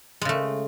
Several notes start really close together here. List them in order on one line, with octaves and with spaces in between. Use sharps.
G#3 C#3 A3